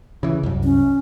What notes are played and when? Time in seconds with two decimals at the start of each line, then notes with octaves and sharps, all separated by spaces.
0.23 C#3 E3
0.43 C2 F#2
0.64 C#4